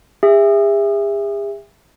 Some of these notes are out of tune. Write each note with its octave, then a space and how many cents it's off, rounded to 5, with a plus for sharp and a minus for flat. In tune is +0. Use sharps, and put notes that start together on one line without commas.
G#4 -45 E5 +5